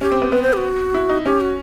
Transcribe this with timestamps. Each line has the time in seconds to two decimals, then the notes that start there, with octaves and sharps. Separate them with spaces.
0.01 C#4 G4
0.12 C4
0.22 B3
0.32 B3 B4
0.42 C5
0.53 G4
0.57 F#4
0.94 E4
1.09 D#4
1.25 C#4 G4
1.41 F#4